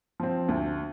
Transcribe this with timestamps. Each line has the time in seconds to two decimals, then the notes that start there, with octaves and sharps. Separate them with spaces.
0.20 F3 C4
0.48 D2